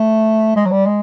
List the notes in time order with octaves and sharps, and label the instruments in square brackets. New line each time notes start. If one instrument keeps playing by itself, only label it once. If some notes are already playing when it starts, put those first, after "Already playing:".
Already playing: [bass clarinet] A3
G#3
F#3
G3
G#3